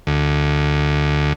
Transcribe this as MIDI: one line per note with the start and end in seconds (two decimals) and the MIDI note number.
0.07 1.33 38